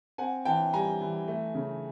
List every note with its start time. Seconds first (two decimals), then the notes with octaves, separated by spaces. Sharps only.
0.18 C4 F#5 G#5
0.45 E3 G5 A5
0.73 G3 G#5 A#5
1.01 E3
1.28 A3
1.55 C#3